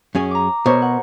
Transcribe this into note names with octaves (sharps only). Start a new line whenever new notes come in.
F#2 C#4 G#4
A#5 D6
B2 A#4 C5 C#5
F#5